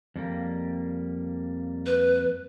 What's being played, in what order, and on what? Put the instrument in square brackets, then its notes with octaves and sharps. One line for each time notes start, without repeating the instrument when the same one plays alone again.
[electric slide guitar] F2 G3 A#3
[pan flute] B4